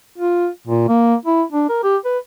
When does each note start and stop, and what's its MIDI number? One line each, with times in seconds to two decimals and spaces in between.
0.18 0.48 65
0.67 0.86 46
0.88 1.15 58
1.25 1.43 64
1.52 1.67 62
1.69 1.83 70
1.83 1.97 67
2.05 2.18 71